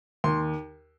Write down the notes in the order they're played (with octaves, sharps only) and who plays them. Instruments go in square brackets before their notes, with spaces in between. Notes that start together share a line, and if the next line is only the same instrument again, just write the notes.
[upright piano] D#2 C6